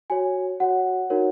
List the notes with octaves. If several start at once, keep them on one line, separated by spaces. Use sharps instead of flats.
F#4 C#5 G#5
F#4 C#5 F#5
D#4 F#4 A#4 C#5